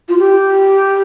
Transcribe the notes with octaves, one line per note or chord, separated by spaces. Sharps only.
F4
G4